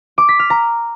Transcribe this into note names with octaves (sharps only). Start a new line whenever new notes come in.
D6
B6
F6
A#5